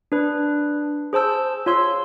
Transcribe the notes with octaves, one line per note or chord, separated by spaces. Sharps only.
D4 B4
G#4 C5 A5 E6 G6
F4 C#5 C6 E6